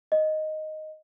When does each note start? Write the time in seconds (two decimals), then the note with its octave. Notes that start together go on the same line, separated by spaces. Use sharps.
0.12 D#5